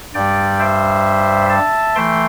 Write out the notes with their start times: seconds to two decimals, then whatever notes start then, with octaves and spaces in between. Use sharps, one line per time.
0.14 G2 G3 D5 G5
0.59 C5 E5
1.50 E5 A5
1.95 E3 A3 G5 C6